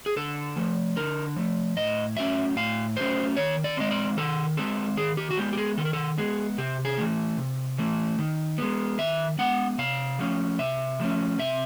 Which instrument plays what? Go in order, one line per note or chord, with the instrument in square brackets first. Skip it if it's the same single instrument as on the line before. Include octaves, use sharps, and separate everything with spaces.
[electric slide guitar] G#4
D3 A4
F3 A3
D3 A#4
F3 A3
A2 D#5
F#3 A3 C#4 E5
A2 F5
F#3 A3 C#4 C5
D#3 C#5
D5
G#3 C4 D#5
D5
D#3 A4
G#3 C4 A4
D#3 G#4
G4
F#4
G#3 B3 G4
G4
G#4
D#3 A4
A#4
A4
G#3 B3 G#4
C3 G4
G#4
E3 A3
C3
E3 A3
D#3
G#3 B3
D#3 E5
G#3 B3 F#5
C3 F5
F3 A3 C#4
C3 E5
F3 A3 C#4
C3 E5